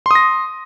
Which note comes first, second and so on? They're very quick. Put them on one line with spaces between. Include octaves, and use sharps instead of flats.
C6 D#6 A#6